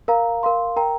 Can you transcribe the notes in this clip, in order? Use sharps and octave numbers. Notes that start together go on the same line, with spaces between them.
A#4 F5 A#5
A#4 F5 C6
A#4 G5 A#5